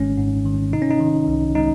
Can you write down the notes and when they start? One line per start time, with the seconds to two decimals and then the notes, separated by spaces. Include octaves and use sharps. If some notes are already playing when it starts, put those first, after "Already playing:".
Already playing: G#1 G#2 D#3 G#3 C#4
0.17 G#2
0.46 D#3
0.73 C3 D#4
0.82 C#4
0.91 D#4
1.00 D#3
1.28 C2
1.55 G#3 D#4